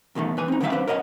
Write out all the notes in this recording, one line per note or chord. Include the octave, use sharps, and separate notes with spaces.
E2 B2 D#3 A3
E2 B4 G#5
C4 D#4
D3 D#3 F#3 B3 E5 F5
D4 B4 C5
A#4 C#5 D#5 F5 F#5